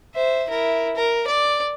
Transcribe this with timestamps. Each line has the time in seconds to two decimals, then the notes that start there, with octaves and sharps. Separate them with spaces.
0.14 C5 E5
0.49 E4 A#4
0.96 A#4
1.28 D5